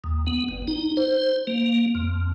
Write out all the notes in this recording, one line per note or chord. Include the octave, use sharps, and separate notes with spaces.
D#2
B3
G1
D#4
C5
A#3
F2